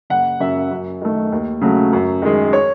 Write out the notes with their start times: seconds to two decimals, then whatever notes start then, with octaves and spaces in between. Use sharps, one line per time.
0.10 F#1 F#5
0.40 F#2 C#3 E5
0.71 F#2
1.02 D#3 A3
1.32 D#2
1.61 C#3 F#3 A3
1.93 F#2
2.22 D#3 G#3
2.53 C#5